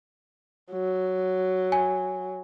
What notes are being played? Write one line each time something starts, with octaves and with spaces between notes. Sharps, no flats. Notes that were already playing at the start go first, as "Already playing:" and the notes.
F#3
G#5